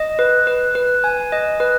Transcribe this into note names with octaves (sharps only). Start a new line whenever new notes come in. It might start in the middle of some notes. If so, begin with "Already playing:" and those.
Already playing: D#5
B4
B4
B4
G#5
D#5
B4